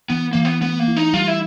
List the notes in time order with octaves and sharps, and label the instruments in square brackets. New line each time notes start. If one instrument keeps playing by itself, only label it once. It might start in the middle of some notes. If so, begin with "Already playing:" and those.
[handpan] E3 [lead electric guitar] B3
[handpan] E3 [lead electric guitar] A#3
[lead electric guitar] B3
[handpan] A3 [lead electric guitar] B3
[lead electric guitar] A#3
[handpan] E4
[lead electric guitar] D#4
[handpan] G3 [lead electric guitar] F4
[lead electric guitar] E4